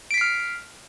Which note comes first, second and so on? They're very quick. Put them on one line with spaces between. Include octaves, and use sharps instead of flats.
D7 B6 C7 F6